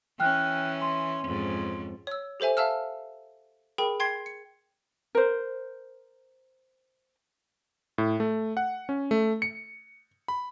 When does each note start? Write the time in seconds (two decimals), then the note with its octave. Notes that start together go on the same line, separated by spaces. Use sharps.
0.20 E3 C#4 G5 F6 F#6
0.82 C6
1.25 F2 G#2 C#4
2.07 C#5 E6
2.40 G4 A4 C5 E5 G#5
2.57 E5 F5 A5 E6 F6
3.78 G#4 A#4 G5 B5
4.00 G5 C6 G#6 C7
4.26 C#7
5.15 A#4 C5
7.98 A2
8.20 A3
8.57 F#5
8.89 C#4
9.11 A3
9.42 C#7
10.28 B5